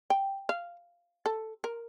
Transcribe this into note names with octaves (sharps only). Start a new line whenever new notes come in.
G5
F5
A4
A#4